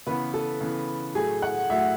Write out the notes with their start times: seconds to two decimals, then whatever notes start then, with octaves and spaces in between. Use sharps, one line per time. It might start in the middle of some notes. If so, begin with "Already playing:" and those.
0.07 C#3 E3 B3 B4
0.34 A4
0.61 C#3 E3 B3
1.15 A2 F#3 A3 G#4
1.42 F#5
1.70 A2 F#3 A3 E5